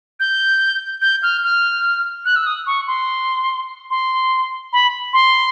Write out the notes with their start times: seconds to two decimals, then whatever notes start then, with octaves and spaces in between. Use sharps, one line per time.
0.20 G6
1.02 G6
1.23 F6
1.44 F6
2.25 F#6
2.36 E6
2.46 D#6
2.67 C#6
2.87 C6
3.90 C6
4.73 B5
5.13 C6